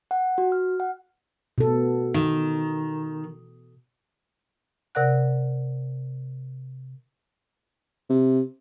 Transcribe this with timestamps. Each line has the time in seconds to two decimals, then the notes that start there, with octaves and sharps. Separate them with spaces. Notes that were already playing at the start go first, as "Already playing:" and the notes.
0.11 F#5
0.38 F#4
0.52 F6
0.80 F#5
1.58 B2 A4
2.14 D#3
4.95 C3 A#4 D5 F#5 F#6
8.10 C3